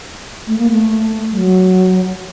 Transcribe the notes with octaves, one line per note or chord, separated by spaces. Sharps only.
A3
A#3
A3
G3
F#3